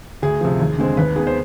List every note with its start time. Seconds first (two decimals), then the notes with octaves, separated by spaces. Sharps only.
0.22 D2 G#4
0.41 C3 F3
0.60 D#2
0.78 D3 G#3 C4
0.97 D#2 B4
1.16 D#3 B3 G#4
1.27 C5